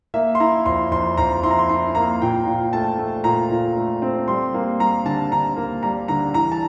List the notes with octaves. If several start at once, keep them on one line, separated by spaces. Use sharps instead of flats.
A#3 E5
C6
E4 A#5
F2 C6
F2 C6
F2 A#5
E4 C6
A#5
C6
E4 C6
A#3 A#5
A#2 G5
A#2
A3 A5
A3
A#2 A#5
A#2
A3
C4
G3 C6
A#3
G3 A#5
D3 A5
D3 A#5
A#3
G3 A#5
D3 A#5
E3 A#5
A5